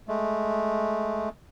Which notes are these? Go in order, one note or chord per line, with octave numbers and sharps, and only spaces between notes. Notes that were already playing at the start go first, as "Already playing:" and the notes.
G#3 A3